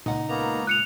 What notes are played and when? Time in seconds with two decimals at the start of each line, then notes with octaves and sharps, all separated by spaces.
0.06 C#2 A#2 D#4 F#5
0.29 A#3 B3 A#5
0.67 D#6 F#6 C#7 F7